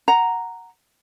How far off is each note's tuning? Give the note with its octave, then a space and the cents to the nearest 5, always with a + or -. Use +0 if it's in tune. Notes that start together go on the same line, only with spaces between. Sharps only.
F#5 +0 A#5 +0